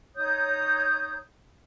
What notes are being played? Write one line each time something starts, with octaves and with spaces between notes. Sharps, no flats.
D#4 C#5 D#6 G6